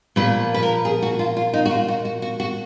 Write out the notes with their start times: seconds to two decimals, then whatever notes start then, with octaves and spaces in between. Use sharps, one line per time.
0.16 A#2 F3 A#3 B4
0.54 B4
0.63 A#4
0.85 G#4
1.02 F#4
1.19 F4
1.37 F4
1.53 D#4
1.65 F#4
1.71 F4
1.88 F#4
2.05 F#4
2.22 F#4
2.40 F#4